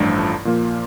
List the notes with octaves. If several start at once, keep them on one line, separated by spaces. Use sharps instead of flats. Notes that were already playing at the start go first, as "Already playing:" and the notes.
Already playing: A1 G2 F3 A3 D4
A#2 F3 A#3 F4